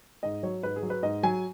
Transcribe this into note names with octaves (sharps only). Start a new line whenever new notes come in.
G#2 D#5
F#3 C#5
G#2 B4
G#4
F#3
B4
G#2 D#5
F#3 G#5